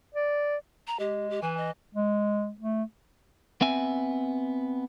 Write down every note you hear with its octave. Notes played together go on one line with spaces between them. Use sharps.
D5
A#5
G#3 G4
G4
E3 G#5
D#5
G#3
A3
B3 C4 E5 G#5